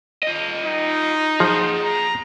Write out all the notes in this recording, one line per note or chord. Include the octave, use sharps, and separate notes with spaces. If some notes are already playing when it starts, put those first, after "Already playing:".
F4 D#5
D#4
F3 G#4 F#5
A#5